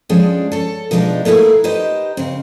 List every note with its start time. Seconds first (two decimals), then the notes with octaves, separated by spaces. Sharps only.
0.09 F3 G#3 C#4 D4 G#4 G5
0.52 A4 C#5
0.91 B2 F3 G3 G#3 D4 D#4
1.25 A3 A#3 D#4 E4 G#4 B4
1.64 D#4 G4 B4 C5 D#5
2.17 C#3 C4